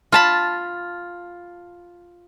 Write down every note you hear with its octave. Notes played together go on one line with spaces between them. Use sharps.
F4 A5 B5